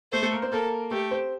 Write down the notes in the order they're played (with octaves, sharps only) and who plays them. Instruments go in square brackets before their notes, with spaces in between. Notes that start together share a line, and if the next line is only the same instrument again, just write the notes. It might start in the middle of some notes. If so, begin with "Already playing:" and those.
[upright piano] A3 A4 [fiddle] C5
[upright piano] A3 A4
A#3 A#4
C4 C5
[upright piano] A#3 A#4 [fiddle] A4
[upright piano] A3 A4 [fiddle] G4
[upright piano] C4 C5